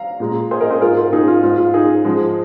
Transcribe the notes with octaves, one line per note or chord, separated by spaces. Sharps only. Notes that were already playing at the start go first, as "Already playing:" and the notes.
Already playing: F5 A#5
A#2 G#3
G#4 C5
A#4 D#5
G#4 C5
G#2 G#3 F4 A#4
F4 A#4
D#4 G#4
F4
G#2 G#3 F4
F4
D#4 G#4
G#2 F3 G#3